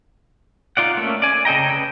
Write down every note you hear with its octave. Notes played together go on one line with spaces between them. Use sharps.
D#4 F4 D5 F#5
A3 A#3 C#4 A4
D5 G#5
C#3 A4 D#5 G5 A#5
B4 D#5 G5